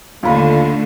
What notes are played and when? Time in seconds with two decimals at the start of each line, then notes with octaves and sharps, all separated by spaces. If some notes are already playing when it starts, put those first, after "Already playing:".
0.23 D#2 D3 A3 F4 B5